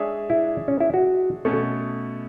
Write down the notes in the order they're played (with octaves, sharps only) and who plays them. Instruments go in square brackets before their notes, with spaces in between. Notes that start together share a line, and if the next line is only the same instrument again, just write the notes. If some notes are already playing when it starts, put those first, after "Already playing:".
Already playing: [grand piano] G#3 D4 G#4 C#5 E5
[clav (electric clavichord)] E4
C#4
E4
F#4
[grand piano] B2 A3 C#4 [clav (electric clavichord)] A4